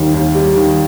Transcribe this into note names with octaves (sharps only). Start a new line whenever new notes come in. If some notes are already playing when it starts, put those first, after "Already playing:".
Already playing: D#2 D#3 G3
D#2
G3
D#3